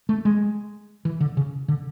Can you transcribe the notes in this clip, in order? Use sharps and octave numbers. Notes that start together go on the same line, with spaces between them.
A3
G#3
E3
D3
C#3
D3